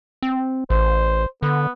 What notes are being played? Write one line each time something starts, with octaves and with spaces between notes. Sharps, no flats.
C4
A1 C5
D3 B3